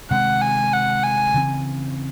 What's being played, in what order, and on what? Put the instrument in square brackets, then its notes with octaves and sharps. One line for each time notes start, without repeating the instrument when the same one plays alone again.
[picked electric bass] C3 D#3 G#3 C4 [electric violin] F#5
[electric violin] G#5
F#5
G#5
[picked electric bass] C#3 E3 C4